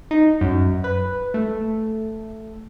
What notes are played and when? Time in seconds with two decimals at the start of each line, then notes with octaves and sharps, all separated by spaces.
0.11 D#4
0.41 F#2
0.84 B4
1.34 A3